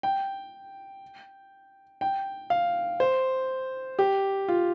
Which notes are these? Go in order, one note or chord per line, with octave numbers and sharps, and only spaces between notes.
G5
G5
F5
C5
G4
F4